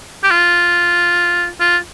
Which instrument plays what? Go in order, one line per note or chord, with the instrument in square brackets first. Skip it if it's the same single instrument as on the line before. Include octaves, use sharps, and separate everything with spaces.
[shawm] G4
F4
F4